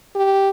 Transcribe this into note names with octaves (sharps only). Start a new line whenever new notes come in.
G4